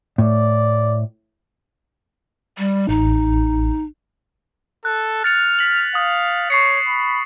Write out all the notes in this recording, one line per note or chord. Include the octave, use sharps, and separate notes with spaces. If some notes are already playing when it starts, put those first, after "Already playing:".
A2 D5
G3
A1 D#4
A4 F#6
F6 A6 C#7 F7
B6 F#7
F5 D#6
C#5 C#6 C7 C#7
B5